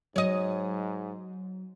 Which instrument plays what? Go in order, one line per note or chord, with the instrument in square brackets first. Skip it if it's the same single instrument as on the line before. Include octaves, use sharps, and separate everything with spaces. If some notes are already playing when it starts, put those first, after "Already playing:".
[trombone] G#2 [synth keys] F#3 [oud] C#5 D#5